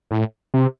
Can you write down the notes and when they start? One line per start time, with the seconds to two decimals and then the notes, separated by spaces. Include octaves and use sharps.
0.11 A2
0.54 C3